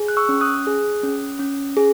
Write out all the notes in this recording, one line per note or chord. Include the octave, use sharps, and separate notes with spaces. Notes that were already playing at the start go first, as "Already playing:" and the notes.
Already playing: G#4
F#6
C#6 E6
C#4
D#6 F#6
G#4
C#4
C#4
G#4